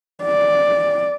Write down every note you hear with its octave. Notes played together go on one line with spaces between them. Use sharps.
D5